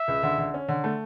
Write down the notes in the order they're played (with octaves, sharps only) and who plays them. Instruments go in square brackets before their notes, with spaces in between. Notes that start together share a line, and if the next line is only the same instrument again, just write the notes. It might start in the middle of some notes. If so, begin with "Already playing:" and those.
Already playing: [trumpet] E5
[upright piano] C#2
D3
D3
C#4
D3
A3